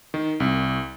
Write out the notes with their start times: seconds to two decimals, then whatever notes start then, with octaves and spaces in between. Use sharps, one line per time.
0.14 D#3
0.40 C2